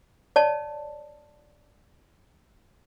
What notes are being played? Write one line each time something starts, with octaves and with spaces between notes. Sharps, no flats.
C#5 D5 A5